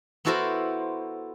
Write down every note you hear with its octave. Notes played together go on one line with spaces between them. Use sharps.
B3 E4 F#4 A4 A#4 C5